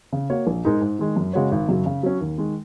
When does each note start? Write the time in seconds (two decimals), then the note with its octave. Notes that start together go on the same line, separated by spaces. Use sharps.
0.13 C#3
0.30 A#3 F#4 C#5
0.47 A#1
0.65 G#2 G#3 D#4 A#4
0.81 G#2
0.99 D#3 G#3
1.16 F#2
1.33 C#3 G#3 F#4 C#5
1.52 G#1
1.69 F#2 C#3 F#3
1.86 C#3
2.03 F#3 C#4
2.21 D#2
2.38 D#3 G#3